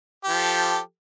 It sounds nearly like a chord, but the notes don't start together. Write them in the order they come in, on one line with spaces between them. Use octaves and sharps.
G4 F3 A4